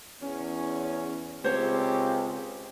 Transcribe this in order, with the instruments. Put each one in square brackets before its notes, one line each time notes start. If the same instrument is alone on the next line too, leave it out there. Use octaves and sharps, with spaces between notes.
[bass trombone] E2 [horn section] C#4
[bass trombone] C#2 [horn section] C4 G4 [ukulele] C5 C#5